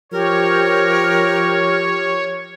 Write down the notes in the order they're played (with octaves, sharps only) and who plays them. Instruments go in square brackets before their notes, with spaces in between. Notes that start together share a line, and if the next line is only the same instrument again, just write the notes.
[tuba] F3 [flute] G4 [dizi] A#4 [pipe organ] C#5